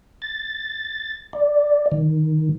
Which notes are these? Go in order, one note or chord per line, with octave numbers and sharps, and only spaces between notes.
A6
D5
D#3